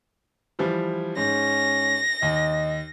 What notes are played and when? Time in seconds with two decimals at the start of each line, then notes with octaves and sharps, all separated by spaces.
0.59 E3 F3 G3
1.17 G#2 C#4 A#6
2.22 D#2 D#5